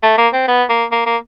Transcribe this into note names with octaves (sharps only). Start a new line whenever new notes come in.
A3
A#3
C4
B3
A#3
A#3
A#3